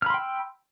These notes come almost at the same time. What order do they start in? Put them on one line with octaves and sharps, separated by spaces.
F6 B5 C6 G5 E6